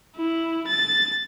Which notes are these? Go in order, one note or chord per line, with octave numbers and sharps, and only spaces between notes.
E4
A6